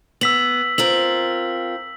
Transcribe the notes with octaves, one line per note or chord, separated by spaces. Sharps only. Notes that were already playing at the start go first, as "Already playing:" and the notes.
B3 E6 B6 F#7
C4 F4 A#4 F#7